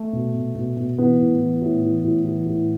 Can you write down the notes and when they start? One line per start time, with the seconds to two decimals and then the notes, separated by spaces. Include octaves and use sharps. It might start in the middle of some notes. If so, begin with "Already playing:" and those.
Already playing: A3
0.13 B2
0.34 B2
0.55 B2
0.77 B2
0.98 E3 B3
1.18 A2
1.40 E3
1.62 A2
1.82 E3
2.04 A2
2.25 E3
2.46 A2